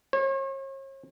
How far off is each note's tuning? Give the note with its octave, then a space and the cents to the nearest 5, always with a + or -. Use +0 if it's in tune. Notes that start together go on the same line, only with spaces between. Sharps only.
C#5 -40